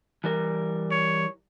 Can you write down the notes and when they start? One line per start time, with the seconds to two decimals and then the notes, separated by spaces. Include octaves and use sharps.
0.24 E3 G3 A#4
0.91 C#5